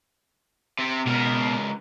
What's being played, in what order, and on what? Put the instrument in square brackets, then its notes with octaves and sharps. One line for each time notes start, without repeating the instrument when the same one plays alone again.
[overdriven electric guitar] C3 C4
[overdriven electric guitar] C#2 A#4 [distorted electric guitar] B2